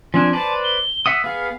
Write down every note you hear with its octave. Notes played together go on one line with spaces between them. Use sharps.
F3 C4 D4 G#5
B4 C5 D5 A5
G7
E5 F#5 D#6
B3 G#4 F5